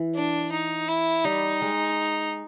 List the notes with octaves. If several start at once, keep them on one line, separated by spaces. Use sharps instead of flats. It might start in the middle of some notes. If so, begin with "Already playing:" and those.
Already playing: E3
D4
D#4
E4
G3 D#4
G#3